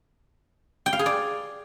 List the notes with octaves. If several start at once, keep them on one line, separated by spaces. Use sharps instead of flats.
G5
F5
G#4
D5